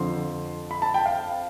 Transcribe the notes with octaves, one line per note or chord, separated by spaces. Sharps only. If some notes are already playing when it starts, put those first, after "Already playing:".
Already playing: F2 D3 F3 C6
B5
A5
G5
F5